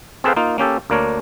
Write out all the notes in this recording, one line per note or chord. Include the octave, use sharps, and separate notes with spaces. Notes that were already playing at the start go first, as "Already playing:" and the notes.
C4 G#4 A4 B4 C5 F5
A#3 D#4 F4
A#3 C#4 G4 A4
D2 A#3 D4 A#4 C#5